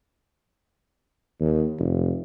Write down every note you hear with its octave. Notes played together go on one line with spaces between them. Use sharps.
D#2
F1